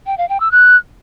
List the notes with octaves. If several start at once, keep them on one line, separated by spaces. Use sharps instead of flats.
G5
F5
G5
E6
F#6